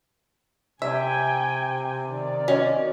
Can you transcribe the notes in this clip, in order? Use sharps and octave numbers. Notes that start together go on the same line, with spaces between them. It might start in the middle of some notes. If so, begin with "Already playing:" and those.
C3 E5 G5 G#5
D#3 D5
C#4 F#4 D#5